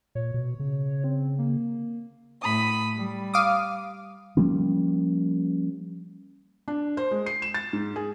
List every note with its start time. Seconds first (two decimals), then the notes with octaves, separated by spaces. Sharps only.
0.15 A#2 C#5
0.34 B2
0.60 C#3
1.04 C4
1.39 A#3
2.42 A2 B5 D#6
2.95 G3
3.34 F5 D6 D#6
4.37 F3 G3 A#3 C#4
6.68 D4
6.97 C5
7.11 G#3
7.26 C7
7.42 E7
7.54 A6
7.73 G#2
7.96 G#4